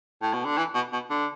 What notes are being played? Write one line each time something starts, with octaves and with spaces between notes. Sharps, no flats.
A2
B2
D3
E3
B2
B2
D3